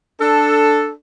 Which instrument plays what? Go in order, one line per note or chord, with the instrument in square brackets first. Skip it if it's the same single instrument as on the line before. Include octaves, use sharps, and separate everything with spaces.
[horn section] D4 A4